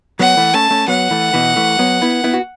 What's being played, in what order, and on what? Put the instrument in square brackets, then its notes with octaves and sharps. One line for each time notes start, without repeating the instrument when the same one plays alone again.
[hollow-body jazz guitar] F#3 B3 [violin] F#5
[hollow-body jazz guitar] E3 A3
[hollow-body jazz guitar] A3 C#4 [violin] A5
[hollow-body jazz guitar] A3 C#4
[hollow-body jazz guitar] F#3 B3 [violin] F#5
[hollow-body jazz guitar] E3 A3
B2 E3
E3 A3
F#3 B3
B3 E4
B3 E4
F#4